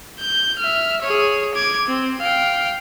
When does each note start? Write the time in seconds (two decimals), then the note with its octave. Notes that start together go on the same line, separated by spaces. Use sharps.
0.20 G6
0.59 E5 F6
1.02 G#4 C#5
1.55 D6 G#6
1.88 C4
2.21 F5 G5